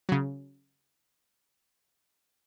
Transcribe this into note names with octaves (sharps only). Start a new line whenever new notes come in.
C#3 F#3